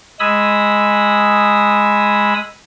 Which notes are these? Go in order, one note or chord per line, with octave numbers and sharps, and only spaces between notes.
G#3 G#5 B5 D#6 E6